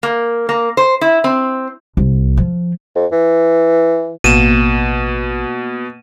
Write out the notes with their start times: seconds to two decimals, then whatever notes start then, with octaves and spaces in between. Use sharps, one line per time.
0.03 A#3
0.49 A#3
0.77 C5
1.01 E4
1.24 C4
1.97 C2
2.37 F3
2.95 F2
3.12 E3
4.24 A1 B2 A#3 D#7 E7